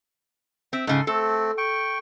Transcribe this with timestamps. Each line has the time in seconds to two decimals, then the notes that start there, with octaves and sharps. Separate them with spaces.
0.73 C4 E5
0.87 G#2 C#3 A4 G#5
1.07 A3 C4 A4
1.58 G5 C#6